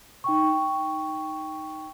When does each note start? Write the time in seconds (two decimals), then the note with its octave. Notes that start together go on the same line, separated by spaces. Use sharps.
0.24 D#4 G5 C#6